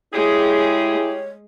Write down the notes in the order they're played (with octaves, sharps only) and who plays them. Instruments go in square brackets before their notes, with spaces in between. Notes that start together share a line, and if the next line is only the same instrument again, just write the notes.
[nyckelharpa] G#3 [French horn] E4 [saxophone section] G4 G#4 [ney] C#5